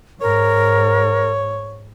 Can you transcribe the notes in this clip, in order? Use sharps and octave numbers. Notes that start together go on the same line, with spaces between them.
G#2 A#4 C#5